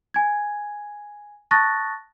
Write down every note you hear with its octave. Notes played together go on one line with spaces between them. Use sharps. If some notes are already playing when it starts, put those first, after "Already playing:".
G#5 G#6
A5 C#6 D#6 F#6 A6 A#6